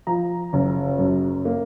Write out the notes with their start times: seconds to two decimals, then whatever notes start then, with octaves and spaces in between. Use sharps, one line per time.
0.07 F3 A#5
0.53 F#1
0.99 F#2
1.45 A#3